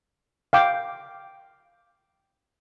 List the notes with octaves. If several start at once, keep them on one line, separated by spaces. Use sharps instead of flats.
F5 G5 D6